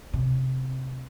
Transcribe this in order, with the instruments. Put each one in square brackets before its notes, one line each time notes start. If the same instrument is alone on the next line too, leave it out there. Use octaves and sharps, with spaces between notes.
[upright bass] C3